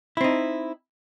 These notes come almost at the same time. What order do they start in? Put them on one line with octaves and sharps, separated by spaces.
E4 C4 D#4